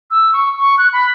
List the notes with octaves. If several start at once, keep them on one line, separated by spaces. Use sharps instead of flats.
E6
C#6
C#6
F#6
B5